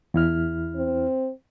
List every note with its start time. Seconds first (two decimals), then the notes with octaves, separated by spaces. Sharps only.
0.14 E2 E4 F6
0.76 C4